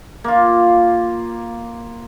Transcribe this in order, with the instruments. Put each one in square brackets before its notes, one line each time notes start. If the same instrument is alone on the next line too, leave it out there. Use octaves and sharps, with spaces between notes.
[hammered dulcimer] A#3 F4